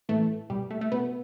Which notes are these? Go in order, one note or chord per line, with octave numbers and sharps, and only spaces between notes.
A2 E3 A3
B2 G3
A3
A3
B2 B3